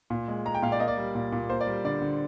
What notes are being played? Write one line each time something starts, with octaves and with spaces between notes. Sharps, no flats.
A#2
G#3
G#3 A#5
G5
A#2 F5
D5
A#3 D#5
D5
G3
A#2
A#2
A#3 C5
D5
G3
D3 D5
D3